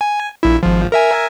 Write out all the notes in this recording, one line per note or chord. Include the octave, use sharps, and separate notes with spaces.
G#5
A#1 E4
G#1 F3
A#4 E5 G#5